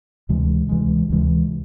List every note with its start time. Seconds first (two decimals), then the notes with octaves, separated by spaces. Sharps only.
0.29 D2 C3 E3 G#3
0.69 D2 C3 E3 G#3
1.10 D2 C3 E3 G#3